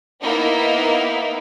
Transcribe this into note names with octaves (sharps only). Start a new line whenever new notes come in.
A#3 B3 D#4 E4